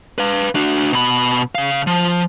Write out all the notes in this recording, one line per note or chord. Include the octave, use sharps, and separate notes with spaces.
B4 F5
D4 F#4
B2 B5
C#3 F5
F3